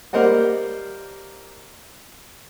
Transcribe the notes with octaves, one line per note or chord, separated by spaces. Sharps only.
G3 A#3 A#4 C5 D#5 F#5